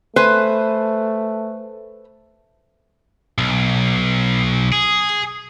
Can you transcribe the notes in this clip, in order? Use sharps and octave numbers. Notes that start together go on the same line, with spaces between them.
A3 B4 C5 G#5
B1
G#4